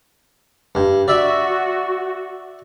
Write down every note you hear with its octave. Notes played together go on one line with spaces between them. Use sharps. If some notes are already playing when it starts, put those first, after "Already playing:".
G2
F#4 D5 E5